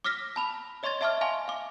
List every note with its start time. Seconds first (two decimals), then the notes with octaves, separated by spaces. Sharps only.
0.04 D6 E6 F6 A#6 B6
0.36 A5 B5 F7
0.83 C#5 D#5 C6 C#6 G#6 A6
1.01 D#5 E5 A5 C#6 D6 F6
1.21 F5 G#5 A5 C6 C#6
1.48 F5 D6